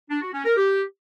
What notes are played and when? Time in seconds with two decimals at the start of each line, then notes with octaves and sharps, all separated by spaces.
0.10 D4
0.22 F#4
0.33 C#4
0.45 A#4
0.57 G4